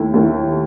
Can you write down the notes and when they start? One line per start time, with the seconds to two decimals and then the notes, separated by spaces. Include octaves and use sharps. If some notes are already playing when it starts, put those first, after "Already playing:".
Already playing: D#2 D#3 A3 E4
0.14 D#2 D#3 A3 E4